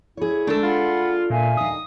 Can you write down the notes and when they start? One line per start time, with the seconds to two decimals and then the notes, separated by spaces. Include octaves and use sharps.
0.17 E4 G#4 C#5
0.47 G#3 A3 D4 A4
0.63 F4 F#5 B5
1.30 A#2 E5 F5 G#5
1.57 D#2 D#4 D#6